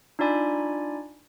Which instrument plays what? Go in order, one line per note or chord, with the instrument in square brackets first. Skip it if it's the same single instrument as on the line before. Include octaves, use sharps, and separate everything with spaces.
[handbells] D4 D#4 F4 D5 G#5 B5